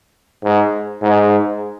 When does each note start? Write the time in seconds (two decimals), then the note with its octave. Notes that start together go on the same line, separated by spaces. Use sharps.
0.44 G#2
1.02 G#2